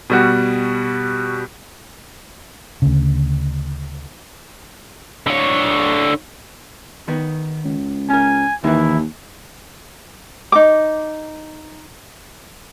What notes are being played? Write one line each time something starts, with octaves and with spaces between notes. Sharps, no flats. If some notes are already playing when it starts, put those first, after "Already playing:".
B2 G3 F#4
D2 C#3
D3 C#5
D#3 B3
C#2
C#4 A#4 G#5
D#2 D#3 E3 E4
D#4 D6